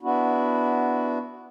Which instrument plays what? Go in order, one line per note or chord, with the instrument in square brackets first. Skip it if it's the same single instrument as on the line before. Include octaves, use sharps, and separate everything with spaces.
[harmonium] B3 D4 E4 F#4